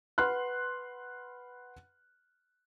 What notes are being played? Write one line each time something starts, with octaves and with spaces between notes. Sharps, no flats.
B4 F#5 B5 C6 F6 F#6